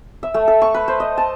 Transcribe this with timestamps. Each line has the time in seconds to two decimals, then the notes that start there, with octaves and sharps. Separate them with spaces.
0.23 E5
0.34 A3
0.48 A4
0.62 C#6
0.74 B4
0.88 C5
1.00 D#5
1.17 A5